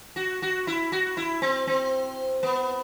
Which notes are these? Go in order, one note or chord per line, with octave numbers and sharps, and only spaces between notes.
F#4
F#4
E4
F#4
E4
C4
C4
B3